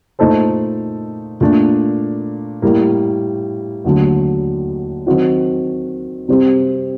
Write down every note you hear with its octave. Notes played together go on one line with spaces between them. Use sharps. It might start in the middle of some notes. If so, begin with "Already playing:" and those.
A#2 A3 D#4 A4 C5
A#2 A3 D4
A2 G3 A#3
D#2 D3 F#3 A3
D#3 F#3 C4 F#4
C3 G3 C4 G4